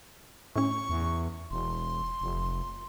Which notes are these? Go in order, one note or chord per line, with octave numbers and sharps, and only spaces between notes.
A2 C#4 C#6
E2
E1 C6
F1